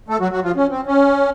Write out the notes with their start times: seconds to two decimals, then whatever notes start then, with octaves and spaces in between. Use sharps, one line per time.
0.08 A3 A4
0.20 F#3 F#4
0.32 F#3 F#4
0.44 F3 F4
0.56 C#4
0.70 C4
0.87 C#4